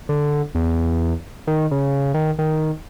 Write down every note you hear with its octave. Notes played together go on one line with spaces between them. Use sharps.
D3
E2
D#3
C#3
D#3
D#3